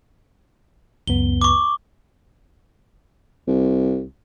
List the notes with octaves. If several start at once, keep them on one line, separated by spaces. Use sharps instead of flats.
C#2 F#2 B3 G7
C#6 D6
C2